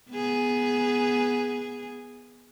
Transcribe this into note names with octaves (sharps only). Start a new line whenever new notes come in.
B3 G#4